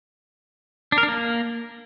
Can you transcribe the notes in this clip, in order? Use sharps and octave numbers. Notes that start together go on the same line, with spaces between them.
D4
A#4
D4
A#3